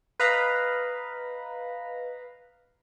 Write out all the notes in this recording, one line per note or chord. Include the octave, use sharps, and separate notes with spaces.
B4 D#5 F5 A#5 B5